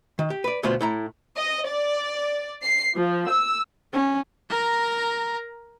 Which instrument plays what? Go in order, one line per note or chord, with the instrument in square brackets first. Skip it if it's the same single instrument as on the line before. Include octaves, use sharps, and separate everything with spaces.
[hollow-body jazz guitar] D#3
G4
B4 D5
D2 B2 B3 F4 C5
A2 E4 A#5
[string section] D#5
D5
C7
F3
E6
[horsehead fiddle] C#4
[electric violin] A#4 A#5